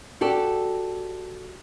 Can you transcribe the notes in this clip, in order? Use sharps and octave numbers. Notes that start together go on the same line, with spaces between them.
F#4 G4 A4 D5